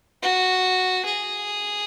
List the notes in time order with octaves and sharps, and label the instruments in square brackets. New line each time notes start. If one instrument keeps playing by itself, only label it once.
[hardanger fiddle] F#4
G#4